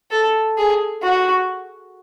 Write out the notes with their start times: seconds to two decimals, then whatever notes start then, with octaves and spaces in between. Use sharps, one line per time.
0.11 A4
0.58 G#4
1.03 F#4